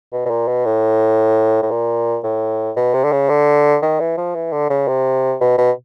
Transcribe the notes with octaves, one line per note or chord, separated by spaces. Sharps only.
B2
B2
A#2
B2
A2
A2
A#2
A2
B2
C3
D3
C#3
D3
D#3
E3
F3
E3
D3
C#3
C3
B2
B2